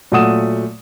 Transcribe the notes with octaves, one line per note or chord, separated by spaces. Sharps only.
A#2 F#3 A3 F#5 D#6 E7